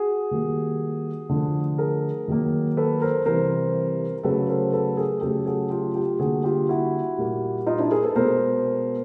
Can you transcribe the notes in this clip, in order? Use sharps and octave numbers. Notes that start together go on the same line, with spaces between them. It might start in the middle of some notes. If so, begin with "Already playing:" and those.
Already playing: F#4 G#4
D#3 G3 A#3
D3 F3 A3
G#4 A#4
D#3 F#3 A#3
A4 B4
A#4 C5
C3 E3 G3 A#4 C5
C#3 F#3 A3 A4 B4
A#4 C5
A4 B4
G#4 A#4
C#3 F#3 A3 G4 A4
F#4 G#4
F4 G4
F4 G4
D3 G3 A#3 F#4 G#4
F4 G4
E4 F#4
A#2 G3 A#3
D#4 F4
D4 E4
G#4 A#4
A4 B4
B2 G#3 A#4 C5